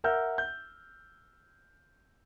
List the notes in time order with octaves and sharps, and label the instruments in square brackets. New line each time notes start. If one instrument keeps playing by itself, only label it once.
[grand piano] A#4 E5 F#5 E6 F6 G6
G6